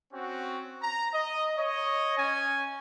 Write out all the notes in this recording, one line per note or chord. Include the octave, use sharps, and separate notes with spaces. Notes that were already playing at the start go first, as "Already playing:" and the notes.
C4 C#4 F#4
A#5
D#5
C#5 D#5
C#4 G#5